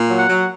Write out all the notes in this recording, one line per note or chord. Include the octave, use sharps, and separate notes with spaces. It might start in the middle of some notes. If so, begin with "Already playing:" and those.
Already playing: A#2
F#3
F#5
F#3